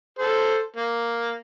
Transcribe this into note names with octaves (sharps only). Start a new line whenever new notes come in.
A4 C5
A#3